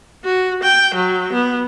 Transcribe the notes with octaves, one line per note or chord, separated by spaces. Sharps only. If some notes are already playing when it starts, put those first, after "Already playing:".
F#4
G5
F#3
B3